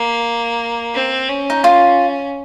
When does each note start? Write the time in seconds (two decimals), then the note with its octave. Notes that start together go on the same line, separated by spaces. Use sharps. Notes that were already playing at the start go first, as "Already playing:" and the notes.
Already playing: A#3
0.95 C4
1.29 C#4
1.50 D#4
1.64 F4